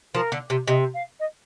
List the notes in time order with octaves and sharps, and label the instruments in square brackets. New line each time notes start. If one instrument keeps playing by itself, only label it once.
[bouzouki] F3 [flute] A#4
[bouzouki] D3
C3
[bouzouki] C3 [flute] D#5
[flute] F5
D#5